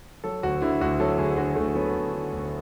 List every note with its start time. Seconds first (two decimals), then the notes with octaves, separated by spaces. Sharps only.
0.24 F#3 A4
0.43 D2 F#4
0.62 D3 E4
0.81 D2 F#4
1.00 F#3 A4
1.18 D2 G#4
1.37 D3 F#4
1.56 D2 A3
1.75 F#3 B3
1.94 D2
2.13 D3
2.32 D2